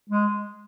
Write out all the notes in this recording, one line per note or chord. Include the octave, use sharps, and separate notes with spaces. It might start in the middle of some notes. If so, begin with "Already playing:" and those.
G#3